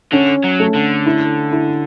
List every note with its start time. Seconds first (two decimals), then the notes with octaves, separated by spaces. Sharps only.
0.12 D3 C#4
0.44 F#3
0.60 A3
0.75 D3
1.06 E4
1.52 E4